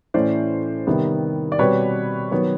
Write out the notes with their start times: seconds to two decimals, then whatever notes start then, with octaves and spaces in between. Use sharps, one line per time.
0.14 A2 E3 A3 C#4 C5 D5
0.87 C3 D#3 G3 B3
1.52 D5
1.59 B2 G3 C4 B4 C#5
2.31 D#3 F#3 B3 B4 C#5